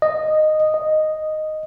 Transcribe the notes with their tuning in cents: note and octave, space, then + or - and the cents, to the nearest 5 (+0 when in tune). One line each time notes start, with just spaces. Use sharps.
D#5 -10
D#5 -5